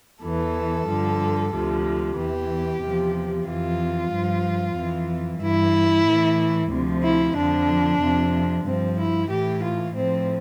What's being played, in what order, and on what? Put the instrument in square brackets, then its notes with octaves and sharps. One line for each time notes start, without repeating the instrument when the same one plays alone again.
[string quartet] E2 E3 A4
G2 D3 F3
D2 C3 F3
E2 E3 G4
E2 C3 F3
F2 E3 F4
G2 F3
F2 E3
G2 E3 E4
A2 E3
D2 C3 F3
E4
F2 D3 F3 D4
F2 C3 F3
G2 F3 C4
E4
A2 E3 G4
F4
A2 F3 C4